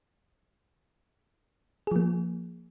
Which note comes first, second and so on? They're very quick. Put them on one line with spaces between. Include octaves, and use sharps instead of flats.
G#4 F3 A#3